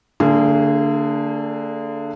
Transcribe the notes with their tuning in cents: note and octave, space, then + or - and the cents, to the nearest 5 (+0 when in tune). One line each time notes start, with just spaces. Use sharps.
D3 +0 A#3 -40 G#4 +0